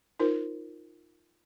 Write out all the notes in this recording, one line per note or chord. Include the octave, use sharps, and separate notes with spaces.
D#4 F4 A#4 C5